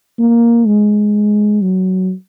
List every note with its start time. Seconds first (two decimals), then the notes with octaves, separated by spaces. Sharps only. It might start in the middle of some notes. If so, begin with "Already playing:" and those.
0.19 A#3
0.67 G#3
1.62 F#3